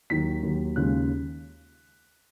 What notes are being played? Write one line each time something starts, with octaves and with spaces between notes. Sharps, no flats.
D#2 D#3 F#3 B6
D#2 D#3 F#3
D#2 C#3 G#3 C#4 F4 F#6